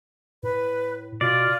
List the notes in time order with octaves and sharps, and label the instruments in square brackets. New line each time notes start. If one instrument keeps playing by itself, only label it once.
[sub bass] A2 [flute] B4
[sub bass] B2 [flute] F4 [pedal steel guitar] D5